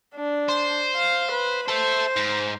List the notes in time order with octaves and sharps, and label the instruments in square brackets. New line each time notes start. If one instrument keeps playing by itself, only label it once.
[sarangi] D4
[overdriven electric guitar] C5
[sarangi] F5
B4
[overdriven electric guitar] A4 E5 [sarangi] C5
[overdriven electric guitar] G#2